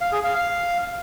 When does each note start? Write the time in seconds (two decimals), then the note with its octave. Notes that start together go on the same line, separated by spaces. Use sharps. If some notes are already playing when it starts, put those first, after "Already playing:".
0.01 F5
0.12 G#4
0.24 F5
0.35 F5